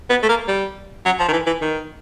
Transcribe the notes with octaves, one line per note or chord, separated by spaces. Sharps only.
B3
A3
A#3
G3
F#3
F3
D#3
E3
E3
D#3